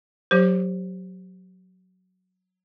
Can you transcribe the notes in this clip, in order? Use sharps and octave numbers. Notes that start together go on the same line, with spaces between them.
F#3 G4 C5